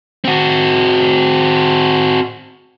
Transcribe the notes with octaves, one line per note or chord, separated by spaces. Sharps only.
C4 F#4